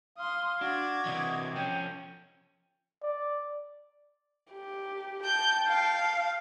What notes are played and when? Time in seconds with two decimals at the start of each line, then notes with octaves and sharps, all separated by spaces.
0.18 F5 C6 D#6
0.61 D4 F#4 D6 G#6
1.06 C3 E3 D#5
1.56 F3 C#4 G5
3.03 D5
4.52 G4
5.25 G5 A5 G6
5.68 F5